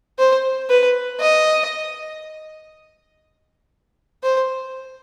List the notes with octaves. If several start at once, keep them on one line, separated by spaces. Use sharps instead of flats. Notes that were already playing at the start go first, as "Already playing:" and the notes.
C5
B4
D#5
C5